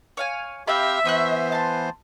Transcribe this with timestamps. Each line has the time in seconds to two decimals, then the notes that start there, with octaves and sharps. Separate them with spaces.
0.17 C#5 F5 G#5
0.68 C4 G4 E5 F5 B5
1.05 E3 B3 C5 C#6 D#6 F#6
1.52 A5 C6